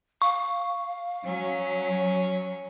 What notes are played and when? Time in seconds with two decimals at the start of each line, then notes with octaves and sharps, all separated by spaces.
0.22 F5 C#6
1.26 F#3 C#4